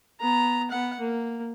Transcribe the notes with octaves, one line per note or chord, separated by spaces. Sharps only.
B3 A#5
B3 F#5
A#3